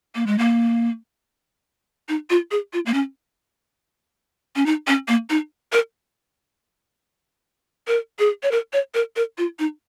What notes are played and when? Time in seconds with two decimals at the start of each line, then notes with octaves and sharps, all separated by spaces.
0.15 A#3
0.27 G#3
0.38 A#3
2.09 D#4
2.30 F4
2.51 G#4
2.73 F4
2.86 A#3
2.94 C#4
4.56 C#4
4.66 D#4
4.88 C#4
5.08 A#3
5.30 D#4
5.72 A#4
7.87 A#4
8.19 G#4
8.43 C#5
8.51 A#4
8.73 C#5
8.94 A#4
9.16 A#4
9.38 F4
9.59 D#4